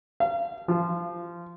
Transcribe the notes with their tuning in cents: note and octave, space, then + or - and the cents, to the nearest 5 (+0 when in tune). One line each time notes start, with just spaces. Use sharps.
F5 -35
F3 -20